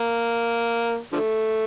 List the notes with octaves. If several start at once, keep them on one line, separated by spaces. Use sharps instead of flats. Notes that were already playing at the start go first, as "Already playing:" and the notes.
Already playing: A#3
D3 F3 A3